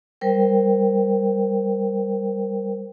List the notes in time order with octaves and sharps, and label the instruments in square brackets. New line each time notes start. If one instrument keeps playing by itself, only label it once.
[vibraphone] G3 A#4 C5 G5